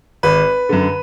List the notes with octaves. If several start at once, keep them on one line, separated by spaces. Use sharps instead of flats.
G#1 B4
F#2 D3